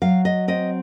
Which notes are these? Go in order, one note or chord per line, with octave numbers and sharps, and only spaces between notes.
F#3 F5
D#5
C4 D#5